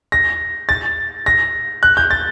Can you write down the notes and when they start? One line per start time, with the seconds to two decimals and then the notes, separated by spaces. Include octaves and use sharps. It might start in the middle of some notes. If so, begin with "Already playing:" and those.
0.12 A#6
0.69 A6
1.26 A#6
1.83 F#6
1.97 G6
2.11 A6